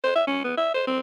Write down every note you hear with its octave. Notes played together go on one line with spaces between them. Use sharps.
C5
E5
C#4
B3
E5
C5
C4